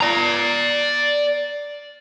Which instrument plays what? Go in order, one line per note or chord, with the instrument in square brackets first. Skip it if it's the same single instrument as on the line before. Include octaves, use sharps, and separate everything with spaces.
[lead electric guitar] D5 A#5